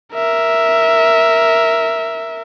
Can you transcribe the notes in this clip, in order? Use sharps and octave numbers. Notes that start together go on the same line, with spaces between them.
A#4 E5